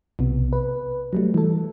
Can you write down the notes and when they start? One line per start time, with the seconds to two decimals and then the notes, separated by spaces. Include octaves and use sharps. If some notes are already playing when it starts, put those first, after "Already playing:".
0.19 B1 C3 B3
0.53 B4
1.13 F#3 G3 A3
1.34 E3 A4